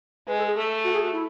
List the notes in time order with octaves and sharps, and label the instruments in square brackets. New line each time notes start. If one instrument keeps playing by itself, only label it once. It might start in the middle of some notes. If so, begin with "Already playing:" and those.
[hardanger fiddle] G#3 [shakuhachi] B4
[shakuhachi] A4
G#4
[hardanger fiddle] A3 [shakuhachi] A4
[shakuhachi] F#4
G#4
F#4
E4